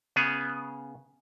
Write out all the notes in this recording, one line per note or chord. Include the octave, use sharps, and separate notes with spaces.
C#3 B3 G#4